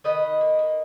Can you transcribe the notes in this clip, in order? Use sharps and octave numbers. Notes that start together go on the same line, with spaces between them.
D#3 B4 D#5
D#3
A#3
A#3